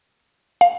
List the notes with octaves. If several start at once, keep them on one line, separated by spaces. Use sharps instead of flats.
F5